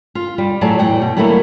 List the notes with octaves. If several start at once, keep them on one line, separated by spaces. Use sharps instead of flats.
F4
G3
A2 F#3 G#4 D5 A5
E2 A2 F#5 G5
B2
F#3 G3 A3 A#3 E4 F#4